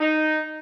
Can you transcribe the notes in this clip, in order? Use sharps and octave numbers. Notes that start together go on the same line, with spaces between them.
D#4